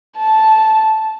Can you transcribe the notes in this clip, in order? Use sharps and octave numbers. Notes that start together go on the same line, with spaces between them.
A5